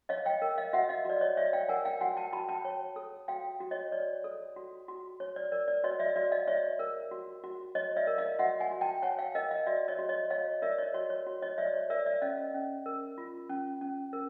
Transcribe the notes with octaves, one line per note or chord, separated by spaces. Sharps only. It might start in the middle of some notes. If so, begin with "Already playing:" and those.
C#5 D#5 F5
F5 G5
A#4
D#5 F5
F#4 E5 F#5
D#5 F5
F#4 D5
C#5 D#5
C#5 D5 E5
F5 G5
A#4 F#5 G#5
F5 G5
F#4 F#5 G#5
G5 A5
F#4 A5 B5
G5 A5
C#5
A4
F#4 F5 G5
F#4
C#5 D#5
C#5 D5
A4
F#4
F#4
C#5
D5
A#4 D5
D5
F#4 C#5 D#5
D5 E5
F#4 D5 E5
D#5 F5
C#5 D5 E5
A#4
F#4
F#4
C#5 D#5
D5 E5
A#4
D#5 F5
F#4 E5 F#5
F#5 G#5
F#4
G5 A5
C#5 F#5 G#5
F5 G5
A#4 D#5 F5
D#5 F5
F#4 D5 E5
C#5 D#5
F#4
C#5 D#5
C#5 D#5 F5
A#4 D5 E5
C#5 D#5
F#4 C#5
C#5
F#4
C#5 D#5
C#5 D5 E5
C#5
A#4 D5 E5
D5 E5
C#4 D#5 F5
C#4
A#4
F4
C#4
C#4
A#4